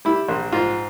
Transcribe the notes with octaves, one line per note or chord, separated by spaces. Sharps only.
G3 E4
A#1
G#2 F4